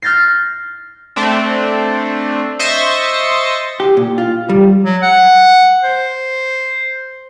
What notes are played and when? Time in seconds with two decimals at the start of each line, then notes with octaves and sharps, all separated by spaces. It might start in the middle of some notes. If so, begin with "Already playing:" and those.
0.02 F6 G6 A6 A#6 C7
1.16 A3 C4 D4
2.59 C5 D#5 E5 C#6 A6 A#6
3.80 G4
3.97 A#2
4.18 F4
4.49 G3
4.85 F#3
5.02 F#5
5.84 C5